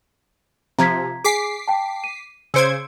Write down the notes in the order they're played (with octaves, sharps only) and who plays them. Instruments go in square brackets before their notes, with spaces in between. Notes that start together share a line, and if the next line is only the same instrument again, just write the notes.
[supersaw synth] C3 F3 [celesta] A#5 G#6 B6
[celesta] G#4 G#5 [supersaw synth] D6 B6 C7
[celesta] G5 A5
D#7
[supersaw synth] C#3 C5 G#6 [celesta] E6 C#7 D7